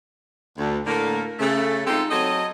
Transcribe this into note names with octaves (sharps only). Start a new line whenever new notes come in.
D2
A2 D3 A3 A#3
C#3 A3
G#3 C4 D#4 F4 G4 A4
F#3 C4 A4 C#5 D#5